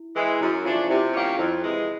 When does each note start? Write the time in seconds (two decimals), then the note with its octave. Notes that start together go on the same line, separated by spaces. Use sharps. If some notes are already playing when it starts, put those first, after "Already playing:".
Already playing: E4
0.16 E3 G#3
0.41 F#2 E4
0.64 C#3 F3 A3 D4 F4
0.88 C3 E4
1.14 D#3 G3 A#3 C#4
1.38 F2 E4
1.62 C3 E3 G#3